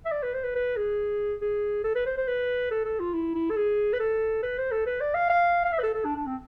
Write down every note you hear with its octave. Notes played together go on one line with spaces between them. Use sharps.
E5
D5
B4
C5
B4
B4
G#4
G#4
A4
B4
C5
C5
B4
A4
A4
F4
E4
E4
A4
G#4
B4
A4
B4
C5
A4
B4
D5
F5
F5
F5
E5
B4
A4
A4
D4
D4
C4